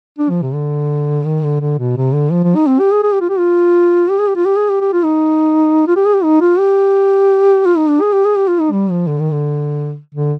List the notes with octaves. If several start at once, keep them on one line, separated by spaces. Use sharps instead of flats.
D4
F3
C3
D3
D#3
D3
D3
B2
C3
D3
F3
F3
D#4
C4
G4
G#4
G#4
G4
F4
G4
F4
G4
G#4
G4
F4
G4
G#4
G4
G4
F4
D#4
F4
G4
G#4
G4
D#4
F4
G4
F4
D#4
D4
G#4
G4
G#4
G4
F4
D#4
G3
F3
D3
D#3
D3
D3